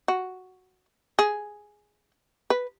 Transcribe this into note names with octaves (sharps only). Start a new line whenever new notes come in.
F#4
G#4
B4